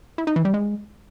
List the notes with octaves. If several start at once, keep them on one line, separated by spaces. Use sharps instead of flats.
E4
D#4
E3
G3
G#3